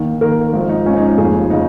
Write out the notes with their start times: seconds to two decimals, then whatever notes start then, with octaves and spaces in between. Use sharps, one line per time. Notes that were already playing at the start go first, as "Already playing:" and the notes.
Already playing: D#2 D#3
0.21 D#2 D#3 A#4
0.53 G#1 G#2 F3
0.69 D#4
0.85 G#1 G#2 F3 C#4
0.96 D#4
1.08 D#4
1.17 F1 D#2 C#3 F3 G#4
1.50 C#3 D#4